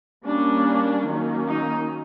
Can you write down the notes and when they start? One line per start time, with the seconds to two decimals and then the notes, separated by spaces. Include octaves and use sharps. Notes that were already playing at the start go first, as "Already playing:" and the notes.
0.25 G3 A#3 C#4 D4
1.06 D#3 F#3 A#3 C#4
1.47 D#4